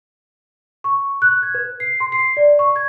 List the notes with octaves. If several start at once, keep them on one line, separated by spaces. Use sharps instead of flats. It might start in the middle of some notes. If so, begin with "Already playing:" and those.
C#6
F#6
G#6
B4
C7
C6
C7
D5
C#6
G#6